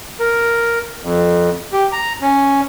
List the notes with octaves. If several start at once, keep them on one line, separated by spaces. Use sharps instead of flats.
A#4
F2
G4
A#5
C#4